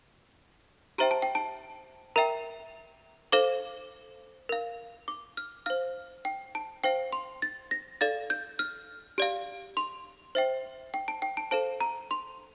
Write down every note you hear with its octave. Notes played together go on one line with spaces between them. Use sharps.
G4 C5 E5 G5 A#5
A5
G5
A5
A#4 E5 G5 A#5
A4 C5 F5 D6
A#4 F5
D6
F6
C5 F5 F6
G5
A5
C5 F5 G5
C6
A6
A#6
A4 D5 F5 A6
G6
F6
G4 D5 F5
C6
C5 E5 G5
G5
A5
G5
A5
A4 C5 F5 A5
A#5
C6